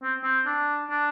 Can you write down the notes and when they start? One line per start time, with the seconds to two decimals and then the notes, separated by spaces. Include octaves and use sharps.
0.03 C4
0.24 C4
0.46 D4
0.90 D4